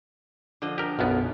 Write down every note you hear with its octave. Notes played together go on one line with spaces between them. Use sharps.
D3 F3 D#5
G4 A#4
B1 F#2 B3